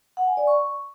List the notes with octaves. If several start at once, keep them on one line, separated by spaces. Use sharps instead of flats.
F#5
G#5
D5
C#6